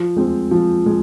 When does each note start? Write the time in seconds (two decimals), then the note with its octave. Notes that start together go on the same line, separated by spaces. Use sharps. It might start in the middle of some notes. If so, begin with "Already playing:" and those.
Already playing: F3
0.16 G#3 C4 F4
0.51 F3
0.86 G#3